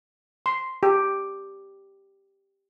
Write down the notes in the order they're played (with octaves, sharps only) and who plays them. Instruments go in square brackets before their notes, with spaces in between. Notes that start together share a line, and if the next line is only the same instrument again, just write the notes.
[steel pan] C6
G4